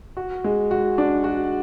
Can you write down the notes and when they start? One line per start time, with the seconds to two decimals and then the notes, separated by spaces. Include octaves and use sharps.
0.17 F#4
0.44 G#3
0.71 F#4
0.98 D4
1.24 F#4